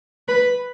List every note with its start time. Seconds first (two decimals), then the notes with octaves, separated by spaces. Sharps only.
0.28 B4